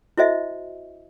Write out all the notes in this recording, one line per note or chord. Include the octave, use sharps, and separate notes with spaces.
E4 F#4 C5 D#5 E5